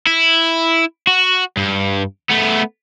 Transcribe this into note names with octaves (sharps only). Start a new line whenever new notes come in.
E4
F#4
G2
A3 B3